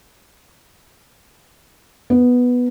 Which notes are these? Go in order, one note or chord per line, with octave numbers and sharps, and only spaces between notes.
B3